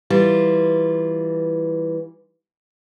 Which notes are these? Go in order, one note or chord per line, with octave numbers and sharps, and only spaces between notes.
E3 G3 F4